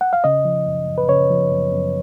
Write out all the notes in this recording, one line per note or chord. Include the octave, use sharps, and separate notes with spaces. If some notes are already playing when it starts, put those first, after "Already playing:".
F#5
F5
C#3 D#5
F3
F#2
F#2
B4
C#3 C#5
F3
F#2
F#2